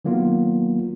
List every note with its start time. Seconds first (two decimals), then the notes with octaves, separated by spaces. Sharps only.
0.05 D#3 F#3 A#3 B3 F4